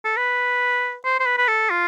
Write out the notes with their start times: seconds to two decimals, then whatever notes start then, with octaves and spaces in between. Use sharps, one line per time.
0.05 A4
0.17 B4
1.05 C5
1.20 C5
1.26 B4
1.38 B4
1.48 A4
1.70 F4